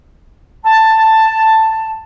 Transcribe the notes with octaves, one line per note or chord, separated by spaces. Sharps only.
A5